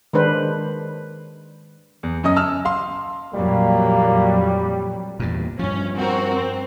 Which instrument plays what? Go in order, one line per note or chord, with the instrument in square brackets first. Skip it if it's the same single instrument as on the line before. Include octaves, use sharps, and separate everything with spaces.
[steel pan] D#3 G#3 D4 B4 C5
[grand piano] E2
F#2 C#4 D#5 D#6
A5 E6 F6
F5 C6
[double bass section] F2 A#2 F#3 [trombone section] G3 [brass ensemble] A#3
[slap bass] E2 G2 A#2
[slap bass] G2 F3 [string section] C#4
[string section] C4 F#4 A#4
C4